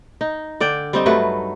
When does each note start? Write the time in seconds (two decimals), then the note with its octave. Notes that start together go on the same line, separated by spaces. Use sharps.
0.21 D#4
0.60 D3 D5 G5
0.93 G3 C4 D#4
1.06 G2 F#3 A3 B4